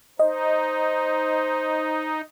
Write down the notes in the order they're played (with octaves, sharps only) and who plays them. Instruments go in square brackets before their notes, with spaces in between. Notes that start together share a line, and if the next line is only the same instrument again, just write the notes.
[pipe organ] D#4 [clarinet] C5 [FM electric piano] D#5